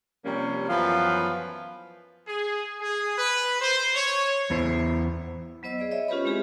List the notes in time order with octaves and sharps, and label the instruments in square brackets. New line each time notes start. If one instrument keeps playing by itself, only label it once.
[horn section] C3 F3 G3 A#3 C#4
F#2 E3 F3 B3 C#4 B4
[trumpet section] G#4
G#4
B4
C5
C#5
[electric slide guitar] E2 B3 E4 C5
[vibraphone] F#3 B3 C5 D#5 E6
G#4 D5 D#5
C#5 D#5 E5
C#4 F4 G4 B4 C5 B5
G#3 C4 E4 G4 G#4